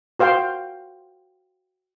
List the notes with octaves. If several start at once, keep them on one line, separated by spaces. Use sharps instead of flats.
F#4 C5 F5 G5 C6